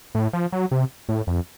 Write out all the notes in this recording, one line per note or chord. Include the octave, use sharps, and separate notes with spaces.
A2
F3
F#3
C3
A2
F2